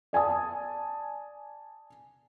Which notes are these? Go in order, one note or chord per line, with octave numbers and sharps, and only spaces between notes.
D5 G#5 A5 D#6